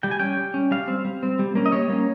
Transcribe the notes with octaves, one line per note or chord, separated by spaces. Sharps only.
G3 G5
G#5
C#4 G5
G3
C#4
G3 F5
C4
G3
C4
G3
A#3 C#4
D#5
G3 C#5
A#3 C#4